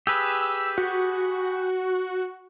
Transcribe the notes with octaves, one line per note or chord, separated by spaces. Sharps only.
G4 G#4 B4 E6
F#4